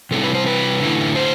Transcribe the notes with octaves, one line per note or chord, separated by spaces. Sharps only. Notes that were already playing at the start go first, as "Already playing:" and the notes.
C3 G3 C4 E4 A4
B4
C5
B4
D3 A3 E4
C5